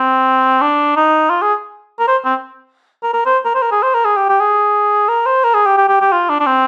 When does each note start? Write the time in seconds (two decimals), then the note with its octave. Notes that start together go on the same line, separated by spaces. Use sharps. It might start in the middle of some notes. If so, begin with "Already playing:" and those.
Already playing: C4
0.61 D4
0.96 D#4
1.30 F4
1.42 G#4
2.00 A#4
2.08 C5
2.25 C4
3.03 A#4
3.13 A#4
3.26 C5
3.45 A#4
3.54 C5
3.62 A#4
3.72 G#4
3.83 C5
3.94 A#4
4.05 G#4
4.17 G4
4.29 G4
4.40 G#4
5.09 A#4
5.26 C5
5.44 A#4
5.54 G#4
5.66 G4
5.77 G4
5.88 G4
6.01 G4
6.12 F4
6.30 D4
6.40 D4
6.46 C4